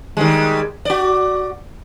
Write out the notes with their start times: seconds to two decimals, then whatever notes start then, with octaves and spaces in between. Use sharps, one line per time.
0.17 D#3 G3 G#3
0.85 F#4 D5